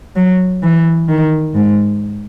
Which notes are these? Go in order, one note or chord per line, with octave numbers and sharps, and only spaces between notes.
F#3
E3
D#3
G#2